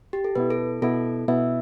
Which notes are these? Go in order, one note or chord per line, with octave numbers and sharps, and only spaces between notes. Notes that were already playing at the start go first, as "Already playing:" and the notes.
G4
A4
B2 B3 E4 B4
A4
B2 B3 E4 A4
B2 B3 E4 E5